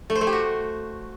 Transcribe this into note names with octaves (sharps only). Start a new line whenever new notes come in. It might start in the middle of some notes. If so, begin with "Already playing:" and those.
A3
C5
A3
G4
F#4